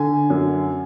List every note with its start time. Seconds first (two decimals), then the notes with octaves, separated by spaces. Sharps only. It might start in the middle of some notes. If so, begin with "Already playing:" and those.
Already playing: D3 G#5
0.30 F#2